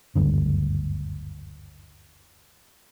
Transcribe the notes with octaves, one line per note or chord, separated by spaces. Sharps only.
F#1 D2 G2 D3